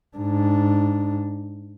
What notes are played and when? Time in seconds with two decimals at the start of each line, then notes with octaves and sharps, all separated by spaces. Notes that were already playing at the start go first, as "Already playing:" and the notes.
0.17 G#2 D4